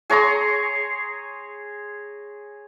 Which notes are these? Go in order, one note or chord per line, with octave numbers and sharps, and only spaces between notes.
G#4 C#5 A#5 C6